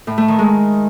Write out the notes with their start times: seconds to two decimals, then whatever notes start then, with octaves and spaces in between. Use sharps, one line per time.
0.07 A2
0.18 A3
0.28 D#3
0.39 G#3